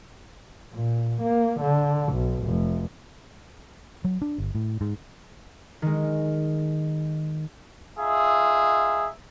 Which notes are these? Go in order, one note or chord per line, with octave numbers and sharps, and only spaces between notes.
A#2
A#3
D3
B1
F1
F#3
D4
G1
A2
G#2
D#3 G#3
D#4 F4 G#4 E5